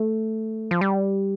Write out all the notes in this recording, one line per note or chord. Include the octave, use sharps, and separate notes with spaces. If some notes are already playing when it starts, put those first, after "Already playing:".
Already playing: A3
F3
G3